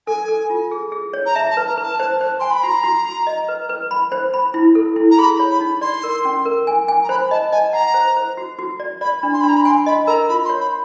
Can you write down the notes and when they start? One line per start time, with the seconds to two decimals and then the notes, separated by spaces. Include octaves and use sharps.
0.07 A4 G#5
0.28 A4
0.50 F4
0.71 G#4
0.92 G#4
1.13 C#5
1.26 A#5
1.35 E5 A5
1.51 A5
1.57 B4
1.67 A#5
1.77 B4
1.83 A5
2.00 C5
2.21 C5
2.40 G#5 C6
2.51 B5
2.63 F#4 A#5
2.83 F#4
3.05 F#4
3.27 D#5
3.49 B4
3.69 B4
3.91 B5
4.12 C5
4.34 B5
4.54 E4
4.75 A4
4.96 E4
5.11 A#5
5.18 G#4 B5
5.40 C#5
5.50 B5
5.61 D#4
5.81 D5 C6
6.03 A#4
6.25 C#4
6.46 A#4
6.67 G#5
6.88 G#5
7.04 A#5
7.09 C5 B5
7.31 D#5 A5
7.52 D#5 G#5
7.73 F#5 A#5
7.94 C5
8.16 C5
8.37 F#4
8.59 F#4
8.80 D5
9.01 D5 B5
9.23 D4
9.33 C6
9.41 D4 B5
9.49 A#5
9.56 B5
9.65 G#5 C6
9.86 D#5 B5
10.07 A#4 A#5
10.29 F4 B5
10.45 C6
10.49 C#5
10.61 B5